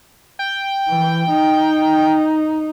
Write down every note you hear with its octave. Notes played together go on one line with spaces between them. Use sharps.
G5
E3
D#4